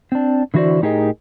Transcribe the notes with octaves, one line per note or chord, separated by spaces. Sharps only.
C4 D4
D3 E3 E4 F#4 C5 D5
A2 D#4 G4 G#4 A#4 D#5